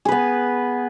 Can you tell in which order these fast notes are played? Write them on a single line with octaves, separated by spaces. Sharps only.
G#4 B4 B3